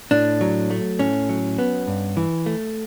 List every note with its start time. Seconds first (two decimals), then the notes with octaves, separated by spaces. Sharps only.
0.11 A2 D4
0.41 F#3
0.70 A3
0.99 A2 C#4
1.29 F#3
1.59 B3
1.87 G2
2.17 E3
2.46 A3